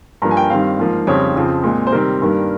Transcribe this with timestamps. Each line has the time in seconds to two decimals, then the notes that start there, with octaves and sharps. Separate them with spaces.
0.22 G2 F3 A#3 A#5
0.31 G#5
0.37 G5
0.50 G2 D#3 G3 C4 F5
0.79 G#2 F3 A#3
1.07 F2 C#3 G3 C4 C#5
1.36 F2 C#3 F3 C4
1.64 A#2 G#3 C4
1.87 C5
1.92 C3 D#3 G3 C4 A#4
2.22 G2 D#3 G3 A#3